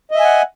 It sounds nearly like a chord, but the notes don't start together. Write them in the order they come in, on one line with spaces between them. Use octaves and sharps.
D#5 E5 G#5 F#5